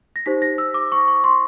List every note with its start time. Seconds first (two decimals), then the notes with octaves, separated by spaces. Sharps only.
0.16 A#6
0.26 D#4 G4 C5 B6
0.42 A#6
0.58 E6
0.74 D6
0.92 C#6
1.08 C#6
1.24 C6